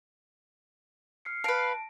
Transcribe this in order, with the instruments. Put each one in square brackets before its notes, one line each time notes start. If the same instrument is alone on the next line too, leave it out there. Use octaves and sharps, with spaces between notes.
[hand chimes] F6 C7 C#7
[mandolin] B4 F5 [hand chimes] A5 A#6 D7